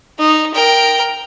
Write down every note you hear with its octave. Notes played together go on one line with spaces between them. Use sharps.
D#4
A#4 G5